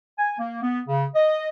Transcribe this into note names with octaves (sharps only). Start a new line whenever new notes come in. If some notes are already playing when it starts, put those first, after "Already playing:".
G#5
A#3
B3
C#3
D#5